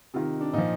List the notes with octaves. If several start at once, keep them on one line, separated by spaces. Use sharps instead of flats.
C3 D#3 F4
D4
A#2 F3 D#4